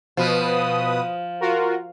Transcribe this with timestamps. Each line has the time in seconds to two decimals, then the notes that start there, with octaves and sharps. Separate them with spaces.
0.17 B2 F3 B4 D#6
1.41 F4 F#4 A#4